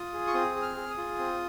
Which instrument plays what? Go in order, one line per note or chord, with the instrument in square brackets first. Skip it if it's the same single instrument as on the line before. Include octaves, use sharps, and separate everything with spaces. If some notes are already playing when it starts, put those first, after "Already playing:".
Already playing: [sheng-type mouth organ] F4 D#6
G#4
C#6
C4 D#6
G#4
F6
G#4
D#6
F4
C4